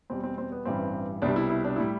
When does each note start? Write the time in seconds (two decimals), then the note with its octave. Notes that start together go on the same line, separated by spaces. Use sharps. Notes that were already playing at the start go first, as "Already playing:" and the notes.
0.10 E2 B2 G3 C4
0.24 C4
0.38 C4
0.52 B3
0.65 A1 G2 E3 G3 C4
1.22 C2 B2 G3 D4
1.36 E4
1.50 E4
1.64 D4
1.76 A2 G3 E4